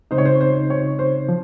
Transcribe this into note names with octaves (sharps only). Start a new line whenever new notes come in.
C#3 G#3 C4 D#4 C5
C#5
C5
C5
C#5
C5
F3